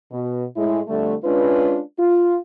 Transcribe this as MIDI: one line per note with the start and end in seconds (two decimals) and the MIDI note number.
0.12 0.45 47
0.56 0.79 45
0.56 0.79 56
0.56 0.79 64
0.88 1.14 41
0.88 1.14 50
0.88 1.14 55
0.88 1.14 57
1.24 1.80 56
1.24 1.80 61
1.24 1.80 62
1.24 1.80 65
1.24 1.80 71
1.99 2.37 65